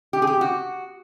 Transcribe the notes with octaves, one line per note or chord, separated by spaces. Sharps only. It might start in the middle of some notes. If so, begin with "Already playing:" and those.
G4
G#4
G4
F#4